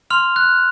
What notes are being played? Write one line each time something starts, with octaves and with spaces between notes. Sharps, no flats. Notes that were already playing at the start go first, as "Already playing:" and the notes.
C6 F6 F7
F#6